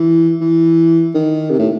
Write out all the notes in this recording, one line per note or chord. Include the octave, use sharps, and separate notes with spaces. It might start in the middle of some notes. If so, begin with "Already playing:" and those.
Already playing: E3
E3
D#3
C3
A2